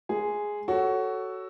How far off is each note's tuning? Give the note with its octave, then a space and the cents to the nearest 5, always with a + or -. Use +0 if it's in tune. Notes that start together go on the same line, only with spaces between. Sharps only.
G#3 +0 G#4 +0
F#4 +15 A4 +0 C#5 +0